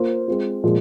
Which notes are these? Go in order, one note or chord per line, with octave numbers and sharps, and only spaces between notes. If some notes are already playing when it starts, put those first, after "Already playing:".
Already playing: A#3 F4 C5
G#3 C4 F4
A#2 F3 G#3